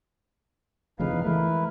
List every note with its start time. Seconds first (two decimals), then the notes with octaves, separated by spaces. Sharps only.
1.00 F1 F2 C#3 D#4 B4 F5
1.11 E2
1.24 E3 G#3 A3 E4 A#4 B4